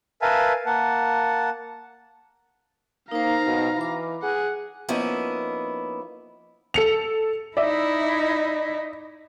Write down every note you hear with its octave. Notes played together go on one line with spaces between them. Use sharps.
A#4 B4 E5 F5 G#5 A5
A#3 F#5 A5
A#3 D#4 C5 F5 A#5
B2
E3 B5 D6
G#4 F#5
F3 A#3 B3 C#4 D#4 E4
A4 C#7 F7
D#4 E4 D5 E5